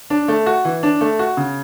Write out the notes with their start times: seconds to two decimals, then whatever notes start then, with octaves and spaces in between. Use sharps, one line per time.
0.10 D4
0.28 A3
0.46 F#4
0.65 E3
0.83 D4
1.01 A3
1.19 F#4
1.37 C#3